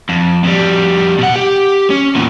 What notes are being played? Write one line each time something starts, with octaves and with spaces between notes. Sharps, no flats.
F2
F2 G3
B2 F#5
G4
C#4
E2 A#2